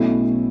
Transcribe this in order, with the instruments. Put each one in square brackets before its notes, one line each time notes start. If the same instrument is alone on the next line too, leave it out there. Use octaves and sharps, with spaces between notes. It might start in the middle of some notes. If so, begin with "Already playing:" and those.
Already playing: [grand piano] B1 B2 A3 C#4 E4